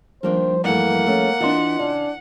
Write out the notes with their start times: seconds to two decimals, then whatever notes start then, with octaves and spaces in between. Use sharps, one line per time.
0.23 D#3 F3 G3 A#3 D4 C5
0.64 G2 E3 A3 A#3 F#5
1.06 A3 C#4
1.41 E3 B3 D4 F4 D#5 C6
1.79 C#3 D4